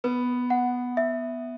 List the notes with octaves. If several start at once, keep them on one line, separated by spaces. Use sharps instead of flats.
B3 B4
F#5
E5